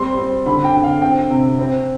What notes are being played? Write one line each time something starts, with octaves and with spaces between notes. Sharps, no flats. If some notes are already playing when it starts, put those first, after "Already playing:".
Already playing: G3 C4 C6
C4
D3 B5
G5
D3
F5
C4 G5
C3
C4